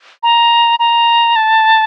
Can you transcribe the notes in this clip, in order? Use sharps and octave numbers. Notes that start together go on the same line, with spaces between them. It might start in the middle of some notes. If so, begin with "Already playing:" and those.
A#5
A#5
A5